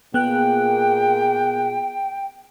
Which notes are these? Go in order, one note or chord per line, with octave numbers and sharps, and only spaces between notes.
A#2 A#3 B3 G#4 G5 F#6